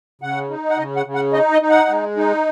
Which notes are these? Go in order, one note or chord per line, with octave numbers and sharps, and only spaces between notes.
C#3 F#5
D#4
F#5
C#3 D#5
F#5
C#3
F#5
D#4 D#5
D#5
D#4
F#5
G#3
D#4